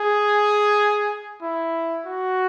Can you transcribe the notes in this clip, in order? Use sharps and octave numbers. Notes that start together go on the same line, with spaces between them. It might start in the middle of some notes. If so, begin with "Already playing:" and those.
Already playing: G#4
E4
F#4